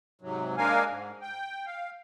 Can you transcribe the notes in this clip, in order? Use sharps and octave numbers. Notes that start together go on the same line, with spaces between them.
G#2 C3 F#3
G#3 A#3 D4 A#4 F5 G#5
G#2
G5
F5